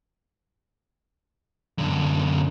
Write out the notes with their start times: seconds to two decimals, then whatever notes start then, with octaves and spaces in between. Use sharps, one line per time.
1.78 F#2 D3